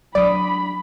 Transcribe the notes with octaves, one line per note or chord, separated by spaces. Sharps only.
F#3 D4 D5 B5 D6 D#6